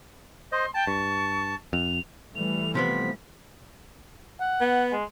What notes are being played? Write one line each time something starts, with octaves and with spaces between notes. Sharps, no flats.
C5 D#5 C6
G5 A5
G2 C#6
F2 F7
E3 G3 A3 F7
C3 F3 B3 B6
F#5
B3
G#3